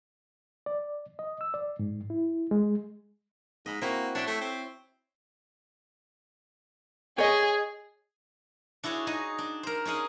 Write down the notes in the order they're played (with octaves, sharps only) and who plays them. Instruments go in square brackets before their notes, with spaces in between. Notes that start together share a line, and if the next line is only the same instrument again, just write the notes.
[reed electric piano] D5
D#5
E6
D5
G#2
E4
G#3
[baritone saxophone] G#2 [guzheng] D#5 B5
[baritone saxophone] A#3 [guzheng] C4 E4 F#4
[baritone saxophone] D4 [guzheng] C#5 E5 G5
[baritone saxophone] A3
C4
[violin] G#4 [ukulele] C#5 D#5
[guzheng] D4 E4 F#4 G#4 C#5
D#4 F#4 G#4 D#5
D4
A#4 C5
C#4 D#4 G#4 F#5 G#5